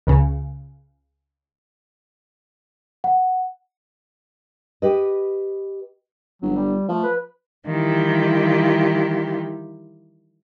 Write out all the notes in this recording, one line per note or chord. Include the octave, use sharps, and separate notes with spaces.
C#2 C#3
F#5
G4 B4 D#5
G1 F#3
G3
F3 A3
B4
D#3 E3 G3 E4 F4 G4